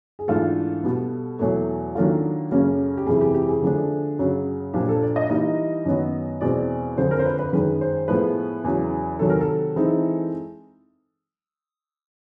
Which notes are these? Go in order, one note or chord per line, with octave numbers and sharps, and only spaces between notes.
G#4
G#2 E3 A3 D4 F4 A4
B2 G3 B3
E2 B2 F#3 A3
D#3 F#3 A#3 D4 F4 A4
F#2 C#3 F#3 A#3 C#4
G4
F2 C3 E3 G#3 G#4
G4
G4
G#4
D3 F3 A3 D4
F#2 C#3 F#3
A#2 F3 A#3 D4 G4
A4
D5
D#5
E3 G3 A#3 D#4 D#5
F#2 D#3 F#3 B3
E2 B2 G#3 C4 D5
F2 D3 F3 C5
A#4
C5
B4
B4
F#2 D#3 G#3 B4
C5
A2 F3 G#3 B3 B4
E2 C#3 F#3
C3 D#3 F#3 A4
A#4
A4
E3 G#3 C4 D#4